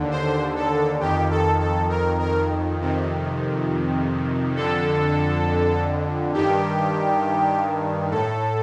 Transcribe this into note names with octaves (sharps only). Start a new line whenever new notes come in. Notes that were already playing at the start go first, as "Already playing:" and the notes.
Already playing: D#2 D3
C5
A4
F2 D#3 G4
A4
A4
A#4
A#4
F2 C3 D#3
F2 D3 A4
G2 D#3 G4
A2 A4